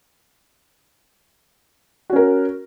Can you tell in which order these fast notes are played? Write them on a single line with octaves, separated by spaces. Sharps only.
F#4 C#4 A#4